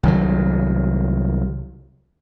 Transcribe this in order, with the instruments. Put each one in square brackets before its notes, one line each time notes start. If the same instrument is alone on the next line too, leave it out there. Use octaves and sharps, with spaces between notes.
[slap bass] C2 D#3 F#3